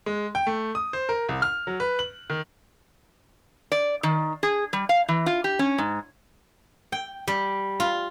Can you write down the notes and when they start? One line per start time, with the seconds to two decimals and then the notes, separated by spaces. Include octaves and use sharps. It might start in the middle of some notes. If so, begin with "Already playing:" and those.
0.06 G#3
0.35 G5
0.47 A3
0.75 D#6
0.93 C5
1.09 A#4
1.29 C2
1.42 F6
1.67 F#3
1.80 B4
1.99 F#7
2.30 D#3
3.72 D5
4.03 D#3
4.43 G#4
4.73 G3
4.89 F5
5.08 E3
5.26 F4
5.44 G4
5.59 C#4
5.78 G#2
6.92 G5
7.28 G3
7.80 F4